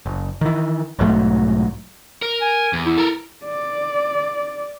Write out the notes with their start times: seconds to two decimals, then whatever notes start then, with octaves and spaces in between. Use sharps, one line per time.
0.06 F#1
0.41 D#3 E3
0.99 B1 G#2 F#3 A3
2.22 A#4
2.42 G#5
2.73 E2
2.86 E4
2.98 A4 A#4
3.45 D5